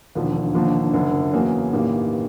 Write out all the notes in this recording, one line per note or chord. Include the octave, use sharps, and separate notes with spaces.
E1 D#2 D3 F3
E1 D#2 D3 F3 A#3
F#1 F#2 D3
E2 C#3 F#3 A#3
A1 G2 D#3 G3 A#3